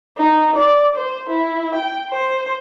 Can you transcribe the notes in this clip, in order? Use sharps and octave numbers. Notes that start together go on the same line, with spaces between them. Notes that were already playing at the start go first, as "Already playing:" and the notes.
D#4
D5
C5
E4
G5
C5